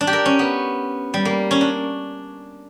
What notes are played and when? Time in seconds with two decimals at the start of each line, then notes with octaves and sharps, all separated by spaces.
0.01 D4
0.07 G4
0.13 A#4
0.25 C#4
0.39 B3
1.14 G3
1.25 A#3
1.51 C#4
1.61 D4